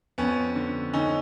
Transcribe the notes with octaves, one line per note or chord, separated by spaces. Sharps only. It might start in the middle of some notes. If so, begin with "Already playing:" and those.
F2 B3 C#4
D3
D3 C#4 D#4